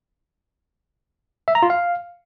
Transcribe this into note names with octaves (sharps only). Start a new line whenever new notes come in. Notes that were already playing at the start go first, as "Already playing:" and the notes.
E5
A#5
F4
F5